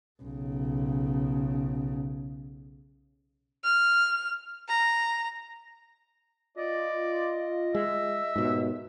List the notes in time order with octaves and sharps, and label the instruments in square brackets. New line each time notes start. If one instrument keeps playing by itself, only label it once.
[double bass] B1 C#3
[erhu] F6
A#5
[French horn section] F4 [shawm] D5 [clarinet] D#5
[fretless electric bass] G#3 [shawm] E5
[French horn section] D#2 [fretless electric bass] G#2 B2